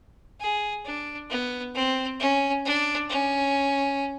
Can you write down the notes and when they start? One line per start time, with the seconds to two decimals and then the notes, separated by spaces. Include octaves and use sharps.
0.40 G#4
0.84 D4
1.30 B3
1.74 C4
2.20 C#4
2.65 D4
3.09 C#4